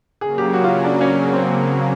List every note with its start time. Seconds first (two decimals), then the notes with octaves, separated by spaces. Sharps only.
0.21 C#3 F#3 A#3 G#4
0.38 G4
0.53 F#4
0.64 F4
0.85 D4
1.01 C#4
1.33 C4